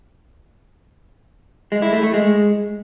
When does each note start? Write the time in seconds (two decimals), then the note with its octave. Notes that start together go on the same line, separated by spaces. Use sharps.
1.72 G#3
1.82 E4
1.93 A3
2.03 A3
2.14 G#3